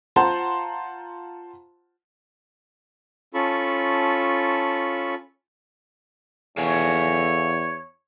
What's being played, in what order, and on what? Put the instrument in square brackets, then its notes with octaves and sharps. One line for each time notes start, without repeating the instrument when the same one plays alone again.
[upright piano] F4 C5 F#5 A5 A#5 C6
[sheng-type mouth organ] C#4 F4 A4 A5 B5 C#6
[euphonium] E2 [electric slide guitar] A4 F5 G#5 [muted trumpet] C#5